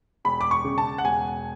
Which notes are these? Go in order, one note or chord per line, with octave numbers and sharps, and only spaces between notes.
E1 B5
D6
C#6
C#3
A5
F#5
E1 G#5